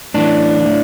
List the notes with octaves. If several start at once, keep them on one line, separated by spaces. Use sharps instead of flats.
A2 E3 D4
A2